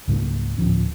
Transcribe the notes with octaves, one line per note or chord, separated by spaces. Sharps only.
C#2 G#2 F#3 A#3
D1 C2 F3 C#4